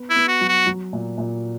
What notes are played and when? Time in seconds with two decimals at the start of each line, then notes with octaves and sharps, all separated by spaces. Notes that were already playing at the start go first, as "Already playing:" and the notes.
Already playing: B3
0.10 E4
0.16 B3
0.28 F#4
0.41 F#3
0.48 F#4
0.66 F#3
0.93 A#2
1.18 A#2